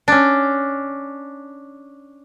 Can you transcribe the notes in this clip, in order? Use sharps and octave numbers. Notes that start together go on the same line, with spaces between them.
C#4 D4